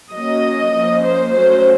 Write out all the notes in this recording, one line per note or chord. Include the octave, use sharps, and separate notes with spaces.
F#3 A#3 C#4 D#5
F3 A#3 C#4
C5
F#3 A3 C#4 C5